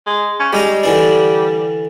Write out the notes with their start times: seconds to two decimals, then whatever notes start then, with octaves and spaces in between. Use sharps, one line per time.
0.07 G#3
0.40 C#4
0.53 G3 G#3 D#4 A#5
0.83 D3 E3 D4